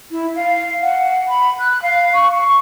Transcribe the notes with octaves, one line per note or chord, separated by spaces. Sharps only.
E4
F5
F#5
B5
F#6
F5
C#6
C#6